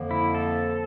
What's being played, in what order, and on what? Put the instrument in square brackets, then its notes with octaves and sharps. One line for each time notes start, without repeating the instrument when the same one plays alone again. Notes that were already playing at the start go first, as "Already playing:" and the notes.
Already playing: [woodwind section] F2 D3 F3 A#3
[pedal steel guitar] E4
A4